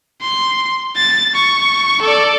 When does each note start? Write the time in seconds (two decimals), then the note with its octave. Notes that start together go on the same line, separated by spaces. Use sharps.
0.22 C6
0.97 A6
1.35 C#6
2.02 A4 D5